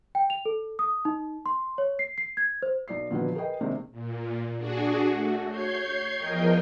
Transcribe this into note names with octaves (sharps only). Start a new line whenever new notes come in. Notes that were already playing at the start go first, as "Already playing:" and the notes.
G5
F7
A4
D#6
D#4
C6
C#5
C7
C7
G#6
C5
B1 D5 C7
A#2 D3 D#3 F3 F#3 B3
G#4 A#4 B4 D#5 G5
C3 D#3 G#3 A#3 C4 D4
A#2
D4 F#4 G#4
A3 F#4
C#5 G6 G#6 C7
E2 F3 A#4 D#5 G5